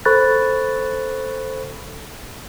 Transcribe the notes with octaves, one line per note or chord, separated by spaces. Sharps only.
A4 C5 B5 C#6 F#6 A6